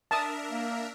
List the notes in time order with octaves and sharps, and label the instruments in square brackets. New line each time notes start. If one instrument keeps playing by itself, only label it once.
[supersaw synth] D4 A#4 E5 [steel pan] A5 D#6
[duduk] A#3